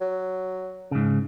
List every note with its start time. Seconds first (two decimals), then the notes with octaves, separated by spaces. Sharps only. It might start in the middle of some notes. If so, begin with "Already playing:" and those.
0.01 F#3
0.91 G#2 C#3